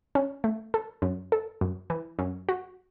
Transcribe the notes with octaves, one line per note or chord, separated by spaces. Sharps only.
C#4
A3
A4
F#2
A4
F#2
E3
F#2
F#4